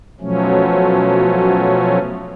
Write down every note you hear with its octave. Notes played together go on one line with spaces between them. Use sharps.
B2 F3 F#3 A3 C#4